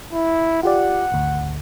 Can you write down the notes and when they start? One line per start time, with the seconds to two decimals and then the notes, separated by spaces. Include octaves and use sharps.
0.13 E4
0.63 F4 G4 D5 F#5
1.12 G#1 D2